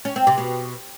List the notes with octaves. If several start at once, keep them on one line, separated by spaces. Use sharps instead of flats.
C#4
C4
C3
B2